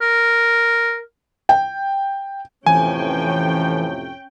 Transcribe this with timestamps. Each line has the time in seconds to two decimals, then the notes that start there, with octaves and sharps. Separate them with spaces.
0.02 A#4
1.49 G5
2.66 F2 A2 C3 E3 C#4 G5 G#5